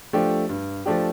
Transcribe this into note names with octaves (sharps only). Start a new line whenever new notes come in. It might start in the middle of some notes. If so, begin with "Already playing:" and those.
F3 A3 D4 G4
G2
F3 A3 D4 G4